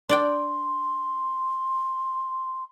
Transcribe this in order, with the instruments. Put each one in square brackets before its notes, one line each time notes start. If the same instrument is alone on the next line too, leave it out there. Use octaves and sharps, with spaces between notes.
[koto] D4 D5 G5 [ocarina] C6